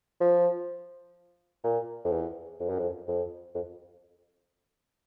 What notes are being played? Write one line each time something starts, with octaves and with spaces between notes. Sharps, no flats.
F3
A#2
F2
E2
F2
F#2
F2
F2
F2